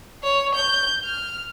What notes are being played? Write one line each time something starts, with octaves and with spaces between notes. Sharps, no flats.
C#5
G6
F6